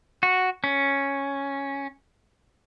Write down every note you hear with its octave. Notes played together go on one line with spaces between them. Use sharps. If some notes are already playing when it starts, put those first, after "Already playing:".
F#4
C#4